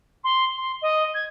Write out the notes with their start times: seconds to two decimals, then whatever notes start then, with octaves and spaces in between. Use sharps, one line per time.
0.24 C6
0.57 C6
0.81 D#5
1.14 G#6